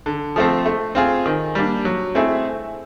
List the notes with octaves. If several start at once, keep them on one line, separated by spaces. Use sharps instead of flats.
D3
F3 A3 C4
A3
C4 F4 G#4
D#3
G3 A#3 D4
F#3
A3 C4 E4 G#4